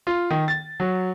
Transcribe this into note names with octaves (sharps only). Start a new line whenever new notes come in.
F4
D#3
A6
F#3